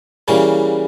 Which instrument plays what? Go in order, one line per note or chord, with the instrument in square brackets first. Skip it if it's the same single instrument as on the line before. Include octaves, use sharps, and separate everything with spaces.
[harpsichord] C#3 E3 G3 A#3